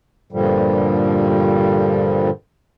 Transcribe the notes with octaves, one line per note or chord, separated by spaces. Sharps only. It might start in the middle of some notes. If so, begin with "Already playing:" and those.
G2 A#2 D3 F3 G3